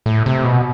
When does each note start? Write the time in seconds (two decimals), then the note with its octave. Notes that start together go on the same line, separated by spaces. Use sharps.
0.06 A2
0.26 C3
0.44 B2